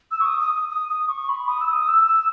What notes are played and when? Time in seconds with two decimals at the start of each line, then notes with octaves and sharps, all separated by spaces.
0.11 E6
0.21 C#6
0.26 D#6
0.40 D#6
0.55 D#6
0.70 D#6
0.89 D#6
1.09 C#6
1.29 B5
1.48 D#6
1.60 E6
1.68 D#6
1.88 E6
2.07 E6